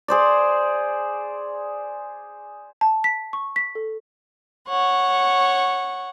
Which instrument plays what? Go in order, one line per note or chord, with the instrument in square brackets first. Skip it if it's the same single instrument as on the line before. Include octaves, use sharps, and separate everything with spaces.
[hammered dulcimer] G#4 C5 D5
[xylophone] A5
B6
C#6
B6
A4
[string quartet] C#5 F#5 C#6